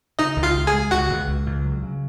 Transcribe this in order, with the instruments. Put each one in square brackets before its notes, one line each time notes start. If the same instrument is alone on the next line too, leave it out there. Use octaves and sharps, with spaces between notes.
[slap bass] C#3 [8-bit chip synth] D#4 D#5
[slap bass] C#2
[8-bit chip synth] F4 F5
[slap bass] C#2
[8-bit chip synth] G#4 G#5
[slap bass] G#3
[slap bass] C#2 [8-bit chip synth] F#4 F#5
[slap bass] C#2
C#2
C#2
F#3
C#3